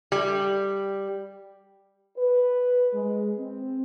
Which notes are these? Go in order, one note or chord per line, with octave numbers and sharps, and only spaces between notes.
G3
B4
G#3
C4